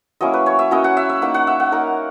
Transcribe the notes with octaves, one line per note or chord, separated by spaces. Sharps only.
F#3 A#3 C#4 E4 D#5
B4
C#5
E5
F#3 A#3 C#4 E4 D#5
F#5
E5
E5
A#3 D#4 F#5
F#5
E5
F#5
A#3 D#4 A#4